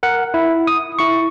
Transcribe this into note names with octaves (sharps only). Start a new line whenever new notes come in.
A#4 F#5
E4
D#6
E4 C#6